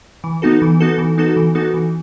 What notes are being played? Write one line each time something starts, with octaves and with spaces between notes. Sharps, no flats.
E3
B3 D#4 F#4 A4
E3
B3 D#4 F#4 A4
E3
B3 D#4 F#4 A4
E3
B3 D#4 F#4 A4
E3